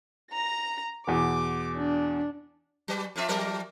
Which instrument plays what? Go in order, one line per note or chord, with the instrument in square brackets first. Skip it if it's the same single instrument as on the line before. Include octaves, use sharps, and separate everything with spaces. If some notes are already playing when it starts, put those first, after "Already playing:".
[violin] A#5 A#6
[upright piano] E2 B2 [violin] D6
[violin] D4
[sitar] F#3 B4
F2 F4 E5
F2 F#3 A#4